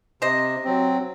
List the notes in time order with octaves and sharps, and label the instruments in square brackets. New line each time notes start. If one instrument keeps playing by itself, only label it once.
[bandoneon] C3 [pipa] C5 D#5
[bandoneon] F#3 C4